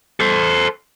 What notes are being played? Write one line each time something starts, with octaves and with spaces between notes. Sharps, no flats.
A4 C5